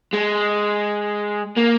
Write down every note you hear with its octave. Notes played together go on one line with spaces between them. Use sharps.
G#3
A#3